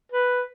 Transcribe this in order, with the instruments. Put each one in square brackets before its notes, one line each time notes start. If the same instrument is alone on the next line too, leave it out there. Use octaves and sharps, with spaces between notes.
[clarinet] B4